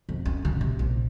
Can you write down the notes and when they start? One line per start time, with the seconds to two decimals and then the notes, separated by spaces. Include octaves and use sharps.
0.09 F2
0.26 C#4
0.45 C#3
0.61 C3
0.79 A#1